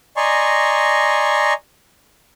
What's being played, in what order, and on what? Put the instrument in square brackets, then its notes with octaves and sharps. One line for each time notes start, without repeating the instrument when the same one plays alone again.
[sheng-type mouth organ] D5 D#5 G#5 A#5 C6 C#6